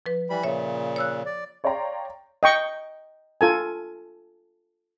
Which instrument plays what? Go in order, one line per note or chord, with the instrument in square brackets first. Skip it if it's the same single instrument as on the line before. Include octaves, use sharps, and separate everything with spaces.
[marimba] F3 B4
[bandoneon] E3 G3 B5
[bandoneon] A#2 C#3 [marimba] C#5 E5
[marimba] C#5 E6 F#6
[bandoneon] D5
[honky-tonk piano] C#5 D5 F5 G5 A#5 C6
[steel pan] D#5 G5 C#6
F4 A4 G#5